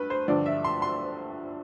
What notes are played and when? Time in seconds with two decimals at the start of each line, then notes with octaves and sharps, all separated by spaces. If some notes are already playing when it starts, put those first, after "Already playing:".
Already playing: G2 B4
0.10 C5
0.28 G2 D3 F3 D5
0.46 E5
0.64 C6
0.82 C6